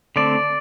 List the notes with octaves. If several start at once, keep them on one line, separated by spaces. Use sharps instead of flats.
D3 A3 C4 D5